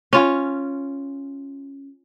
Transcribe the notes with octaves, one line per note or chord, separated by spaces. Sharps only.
C#4 F4